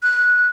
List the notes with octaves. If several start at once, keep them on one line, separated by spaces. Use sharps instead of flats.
F#6